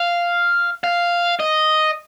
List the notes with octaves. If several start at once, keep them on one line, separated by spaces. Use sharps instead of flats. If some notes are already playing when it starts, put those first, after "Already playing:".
Already playing: F5
F5
D#5